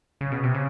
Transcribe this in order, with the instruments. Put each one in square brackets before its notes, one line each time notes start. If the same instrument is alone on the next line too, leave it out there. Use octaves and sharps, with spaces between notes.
[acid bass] C#3
B2
C3
C#3